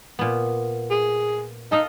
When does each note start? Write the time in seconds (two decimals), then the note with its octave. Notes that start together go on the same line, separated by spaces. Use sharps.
0.19 A#2 B3
0.90 G#4
1.72 D#4 A4 D#5 F5